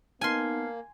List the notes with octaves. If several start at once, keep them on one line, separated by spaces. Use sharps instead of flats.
A#3 B3 D#4 G#5 A5 C6 F6 C7